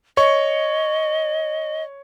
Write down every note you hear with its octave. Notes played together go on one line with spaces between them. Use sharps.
C#5 D#5 C#6